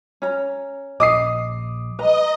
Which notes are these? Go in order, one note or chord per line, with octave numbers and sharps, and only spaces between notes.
C#4 A#5
A#1 D#5 D6 D#6 C7
B4 D#5 A#5